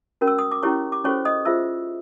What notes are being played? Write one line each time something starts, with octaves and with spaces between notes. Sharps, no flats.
C#4 F#4 A#4
E6
D#6
D6
C#4 E4 G4 C#5 C#6
D6
C#4 F#4 A4 C5 C#5 C#6
D#5 D#6
F4 G#4 C5 E5 E6